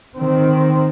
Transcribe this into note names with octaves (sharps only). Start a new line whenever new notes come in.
D#3 C4